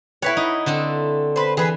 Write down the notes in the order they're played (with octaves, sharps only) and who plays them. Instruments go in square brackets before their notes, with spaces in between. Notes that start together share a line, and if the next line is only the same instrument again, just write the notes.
[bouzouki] E4 B4 F#5 [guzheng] C#5
[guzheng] D#4
D3 C4 A4
[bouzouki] B4 C5
[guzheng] E3 [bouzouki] G#4 B4